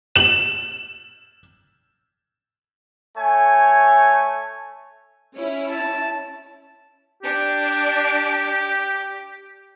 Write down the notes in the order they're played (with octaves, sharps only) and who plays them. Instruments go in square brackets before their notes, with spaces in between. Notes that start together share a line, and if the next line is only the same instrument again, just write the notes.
[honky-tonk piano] E7 F#7
[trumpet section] A3 C#5 G#5
[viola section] C#4 E4 C#5
[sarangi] A5
[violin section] D4 D7 [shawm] G4